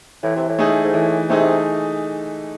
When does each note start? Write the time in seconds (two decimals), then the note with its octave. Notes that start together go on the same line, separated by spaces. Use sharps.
0.23 A2 E3
0.36 C3
0.49 A2
0.59 A3 D#4 G#4
0.84 G#2
0.94 A2 E3
1.30 C3 A3 D#4 G#4